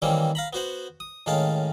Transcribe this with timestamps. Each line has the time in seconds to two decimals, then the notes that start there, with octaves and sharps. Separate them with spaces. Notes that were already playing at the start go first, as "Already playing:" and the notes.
0.02 D#3 E3 G3 A#3 C4 C#4
0.35 F5 A#5 B5
0.53 B3 F#4 C5 F#5
1.00 D#6
1.26 A2 D#3 G#3 C#4 F5 A5